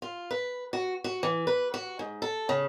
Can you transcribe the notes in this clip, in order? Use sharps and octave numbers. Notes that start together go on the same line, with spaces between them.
F4
B4
F#4
F#4
E3
B4
F#4
G#2
A4
C#3